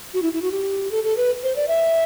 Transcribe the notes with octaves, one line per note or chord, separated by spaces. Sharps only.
F#4
E4
E4
F#4
G4
A4
A4
B4
C5
D5
E5